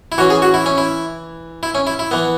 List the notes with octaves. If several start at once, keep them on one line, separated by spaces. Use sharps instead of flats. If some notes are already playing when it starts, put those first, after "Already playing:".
E4
E3 C#4 F#4
G#4
F#4
E4
C#4
E4
E4
C#4
E4
E4
E3 B3